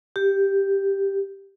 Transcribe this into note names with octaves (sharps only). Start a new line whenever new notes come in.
G4